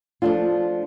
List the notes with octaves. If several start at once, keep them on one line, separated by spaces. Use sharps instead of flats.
F3 A3 D4 F4